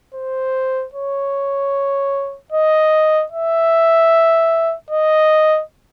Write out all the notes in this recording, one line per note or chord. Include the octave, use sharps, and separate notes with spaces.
C5
C#5
D#5
E5
D#5